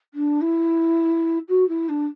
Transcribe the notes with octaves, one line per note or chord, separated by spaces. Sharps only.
D4
E4
F#4
E4
D4